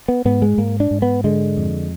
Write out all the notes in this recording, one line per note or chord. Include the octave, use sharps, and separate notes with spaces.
B3
G#2 B3
G#3
G#2 A#3
D4
G#2
B3
D3 G#3
F2